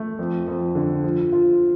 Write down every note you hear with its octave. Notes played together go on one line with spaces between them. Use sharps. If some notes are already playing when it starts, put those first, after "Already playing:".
Already playing: A3
F2
F2
D3
F3
F4